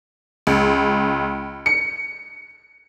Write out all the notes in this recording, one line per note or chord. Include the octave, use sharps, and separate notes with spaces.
C#2
C#7